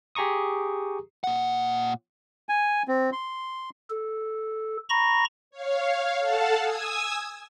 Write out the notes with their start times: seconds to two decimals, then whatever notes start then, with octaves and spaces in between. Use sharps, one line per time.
0.15 G4 G#4 A#5 C#6 D#6
1.24 A#2 F#5
2.49 G#5
2.88 C4
3.12 C6
3.90 A4
4.89 A#5 B5 C#6 A#6
5.51 C#5 F5
6.19 A4 F5 F#5 A5
6.59 G#5 D#6 E6 G#6